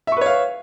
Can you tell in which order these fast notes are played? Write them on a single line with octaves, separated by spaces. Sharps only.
E5 C#6 B4 C#5 F5